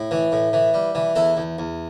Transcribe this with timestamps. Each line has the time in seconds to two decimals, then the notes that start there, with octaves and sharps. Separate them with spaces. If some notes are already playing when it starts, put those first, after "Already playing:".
Already playing: A2
0.11 E3
0.32 A2
0.53 E3
0.74 G3
0.95 E3
1.15 E2 E4 A4
1.37 E2
1.59 E2